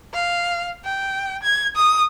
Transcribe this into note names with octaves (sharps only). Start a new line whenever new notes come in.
F5
G5
G#6
D#6